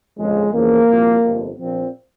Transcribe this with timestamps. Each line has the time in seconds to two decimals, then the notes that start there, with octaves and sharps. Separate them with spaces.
0.17 G1 F2 C#3 F3 G#3
0.53 E2 C#3 F3 A#3
0.87 C2 A#2 F3
1.23 G1 F2 C3
1.58 A#1 A#2 F3 C4